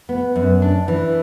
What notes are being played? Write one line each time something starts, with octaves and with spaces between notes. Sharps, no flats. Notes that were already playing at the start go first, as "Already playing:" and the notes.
B3
F#2
D4
E3